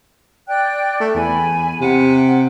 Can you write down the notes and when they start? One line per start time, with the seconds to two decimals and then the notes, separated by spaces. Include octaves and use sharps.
0.48 D5 G5 F#6
1.00 A3
1.14 E2 G#5 B5
1.80 C3 F#5